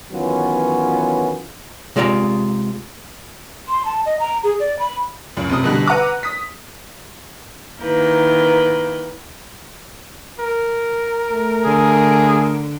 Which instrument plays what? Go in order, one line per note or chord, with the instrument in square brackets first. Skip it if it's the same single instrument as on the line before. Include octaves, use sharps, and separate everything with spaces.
[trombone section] D#3 E3 F#3 B3 C#4 F4
[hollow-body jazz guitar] C3 G#3 F4 D5 E5 A#5
[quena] C6
A5
D#5
A#5
G#4
D5
B5
[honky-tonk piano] C#2 F#2
F1 C3 D#6
B2 D3 G3
B4 F#5 A#5 D6 E6
D#6 B6
[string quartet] D#3 A#3 E4 A#4 B4 G6
[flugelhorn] A#4
[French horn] A3
[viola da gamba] D3 [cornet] G#4